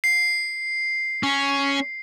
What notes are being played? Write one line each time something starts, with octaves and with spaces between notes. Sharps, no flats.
C7
C#4